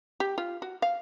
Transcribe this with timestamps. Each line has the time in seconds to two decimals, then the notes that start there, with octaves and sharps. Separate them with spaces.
0.20 G4
0.38 F4
0.62 F#4
0.82 F5